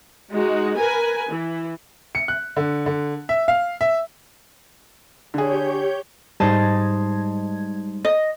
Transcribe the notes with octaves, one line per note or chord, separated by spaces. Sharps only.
G#3 D#4 F#4
A#4 B4 G#5
E3
C#7
F#6
D3
D3
E5
F5
E5
D3 G4 G#4 C#5 G6
G#2 G3 G#3 D#4 C5 D#5 A5 G#6
D#5